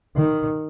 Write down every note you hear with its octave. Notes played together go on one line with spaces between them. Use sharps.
D#3